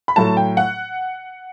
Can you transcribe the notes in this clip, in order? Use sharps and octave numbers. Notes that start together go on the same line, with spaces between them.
B5
A2 F#3 A3 A5
G5
F#5